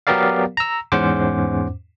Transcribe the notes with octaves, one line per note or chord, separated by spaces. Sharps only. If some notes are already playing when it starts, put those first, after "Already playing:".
F#3 B3 G4 A#4 D5 F5
A#5 E6
E2 G#2 C#4 C5 F#5 D6